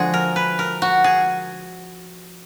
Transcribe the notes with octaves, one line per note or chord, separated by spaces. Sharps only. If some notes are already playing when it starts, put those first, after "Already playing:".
Already playing: D3 F3 G#3 F#4 G#4
A#4
B4
A#4
F#4
G#4